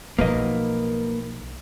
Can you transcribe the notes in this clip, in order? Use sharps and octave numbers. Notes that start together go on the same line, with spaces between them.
B1 F3 A#3 B4 D#5